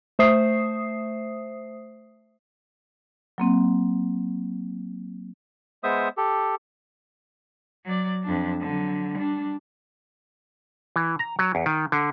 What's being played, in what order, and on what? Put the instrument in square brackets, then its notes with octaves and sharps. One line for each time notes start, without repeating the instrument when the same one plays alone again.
[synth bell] A3 C5 E5 D#6 C7
[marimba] F#3 A#3 C4
[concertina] G#3 B3 C5 E5 D#6
G4 A4
[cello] F#3 D5
F2 D4
D3 F#3
G3 D4
[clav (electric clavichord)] E3
A#5
F#3
E2
D#3
D3